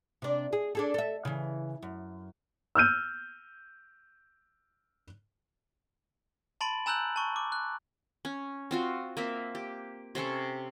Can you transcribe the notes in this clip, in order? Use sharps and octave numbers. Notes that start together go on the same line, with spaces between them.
C3 D4
G#4
D4 G#4 A4
A4 E5
C#3 E3
F#2
E6 F6 G6 D#7
A5 B5 C6 A6 D7 F#7
G#5 A#5 E6 F#6 G6 F#7
A5 C#6
D6
F#6
C#4
C4 F4 F#4
A#3 C4 E5
G4
C3 C4 C#4 A4